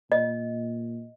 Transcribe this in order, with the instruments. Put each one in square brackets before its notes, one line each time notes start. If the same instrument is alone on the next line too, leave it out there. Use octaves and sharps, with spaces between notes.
[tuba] A#2 [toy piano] D#5